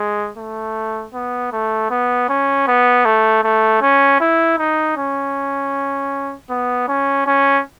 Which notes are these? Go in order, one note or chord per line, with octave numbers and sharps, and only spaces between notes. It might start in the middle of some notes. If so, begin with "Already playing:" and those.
Already playing: G#3
A3
B3
A3
B3
C#4
B3
A3
A3
C#4
E4
D#4
C#4
B3
C#4
C#4